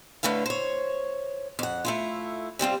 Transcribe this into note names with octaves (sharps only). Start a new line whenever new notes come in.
A2 D3 A3 B4 F5
C5 C#5
F2 F#5
A3 E4 F4
C3 G3 C4 F4